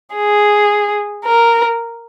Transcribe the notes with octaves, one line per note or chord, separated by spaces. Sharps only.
G#4
A#4